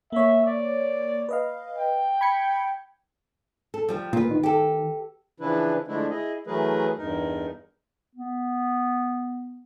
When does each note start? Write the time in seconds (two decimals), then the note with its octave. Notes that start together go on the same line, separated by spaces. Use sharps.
0.12 A#3 C#5 E5
0.46 D5
1.29 B4 D#5 F5
1.78 G5
2.21 B5 G#6 C#7
3.74 A4
3.89 F3 G3 G4
4.13 A#2 F4 B4
4.31 D#3
4.43 G4 A4
5.40 C#3 E3 F3 D4 E4 B4
5.88 D3 F3 G#3 A3 D4 E4
6.10 E4 G#4 D#5
6.47 E3 F#3 A3 G#4 A#4 B4
6.98 E2 G2 D#4 A#4
8.15 B3